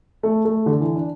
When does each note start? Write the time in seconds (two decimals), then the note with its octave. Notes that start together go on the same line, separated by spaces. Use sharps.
0.23 A3
0.45 A3
0.66 D3
0.81 E3
0.95 D4